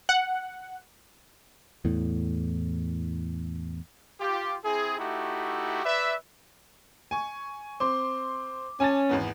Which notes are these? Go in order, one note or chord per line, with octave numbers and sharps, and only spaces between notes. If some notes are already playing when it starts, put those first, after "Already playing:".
F#5
E2 A2
F4 G4
C4 E4 G#4
A3 D#4 E4 F#4 G4
B4 D5 E5
G#5 C#6
C4 C6 D6
C#4 G#5 A5 A6
G#1 E2 B3